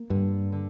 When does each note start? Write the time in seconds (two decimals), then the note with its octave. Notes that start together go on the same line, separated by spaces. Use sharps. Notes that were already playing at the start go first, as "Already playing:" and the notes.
Already playing: A#3
0.10 G2 D3
0.52 D3